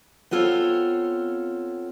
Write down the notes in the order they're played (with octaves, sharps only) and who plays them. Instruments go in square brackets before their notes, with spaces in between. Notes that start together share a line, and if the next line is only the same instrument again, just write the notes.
[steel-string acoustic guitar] B3 C4 F4 A4 C#5